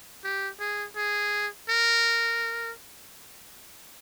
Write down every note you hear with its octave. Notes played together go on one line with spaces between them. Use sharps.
G4
G#4
G#4
A#4